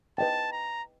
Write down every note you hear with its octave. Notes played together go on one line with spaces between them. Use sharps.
B4 D#5 G5 A5
A#5